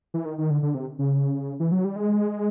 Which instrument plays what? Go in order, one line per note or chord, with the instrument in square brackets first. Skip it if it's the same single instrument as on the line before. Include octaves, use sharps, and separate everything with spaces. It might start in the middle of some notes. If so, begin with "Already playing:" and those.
[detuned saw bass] E3
D#3
D#3
D3
D3
C3
C#3
E3
F#3
G3
G#3